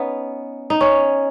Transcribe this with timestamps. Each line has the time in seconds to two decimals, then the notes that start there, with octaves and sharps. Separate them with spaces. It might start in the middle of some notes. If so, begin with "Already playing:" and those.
Already playing: B3 C#4 D#4
0.70 D#4
0.81 C#4